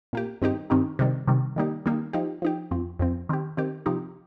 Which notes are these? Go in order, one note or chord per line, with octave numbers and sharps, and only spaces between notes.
A#2 A#3 G4
G2 D#3 C4 D#4 G4
G2 D#3 C4 D#4 G4
C3 D#3 G3
C3 D#3 G3
D#3 G3 A#3 D#4 G4
D#3 G3 A#3 D#4 G4
F3 D#4 G4
F3 D#4 G4
F2 F3 C4
F2 F3 C4
D#3 C4 G4
D#3 C4 G4
C3 F3 D#4 G4